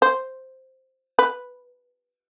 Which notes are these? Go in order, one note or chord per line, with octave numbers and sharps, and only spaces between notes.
C5
B4